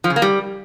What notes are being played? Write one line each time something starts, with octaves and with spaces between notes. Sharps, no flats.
F3
C#3
A#3
G3